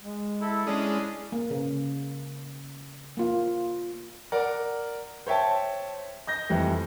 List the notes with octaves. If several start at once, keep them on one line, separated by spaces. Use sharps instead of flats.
G#3
E4 A4
G#3 C#4 D4 E4 G#4 D#6
A#3
C#3
A#3 F4
A#4 D5 F#5
C5 C#5 E5 G5 A5
D#5 G6 A#6
F2 E3 G3 A3